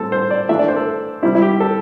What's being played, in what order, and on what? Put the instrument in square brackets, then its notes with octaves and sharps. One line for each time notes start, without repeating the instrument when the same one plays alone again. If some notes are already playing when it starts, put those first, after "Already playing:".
Already playing: [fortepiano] A2 G3 C4 A4
C5
D5
E3 A3 D4 E5
D5
C5
A4
C3 G3 C4 E4
E4
G4
A4